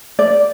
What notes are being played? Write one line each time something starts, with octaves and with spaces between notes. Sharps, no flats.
D5